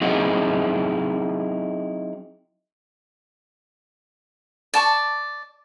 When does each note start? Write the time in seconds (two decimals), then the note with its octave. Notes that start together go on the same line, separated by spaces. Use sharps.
0.01 F#3 C4 D#4 E4 F#4 G#4
4.74 D5 A5 C#6